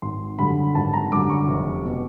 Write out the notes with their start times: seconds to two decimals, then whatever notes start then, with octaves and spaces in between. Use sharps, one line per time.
0.02 G#1 C6
0.38 F#2 D3 G3 B5
0.75 G#1 A5
0.93 A#5
1.11 F#2 D3 G3 D6
1.29 C#6
1.48 F1
1.85 B2